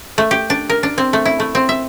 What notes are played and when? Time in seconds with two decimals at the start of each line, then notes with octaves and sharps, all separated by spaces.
0.18 A3
0.31 G4
0.50 D4
0.70 A#4
0.83 D4
0.98 C4
1.13 A3
1.25 E4
1.40 A3
1.55 C4
1.69 E5